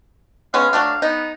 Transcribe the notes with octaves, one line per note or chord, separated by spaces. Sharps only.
G#3 B3 C#4 F5
F#3 A3 D4
B3 D#4